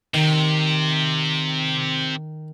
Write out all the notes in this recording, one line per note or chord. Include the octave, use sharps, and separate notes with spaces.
C3 D#3